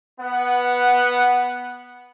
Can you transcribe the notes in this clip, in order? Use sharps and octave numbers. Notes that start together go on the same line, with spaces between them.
B3 F#5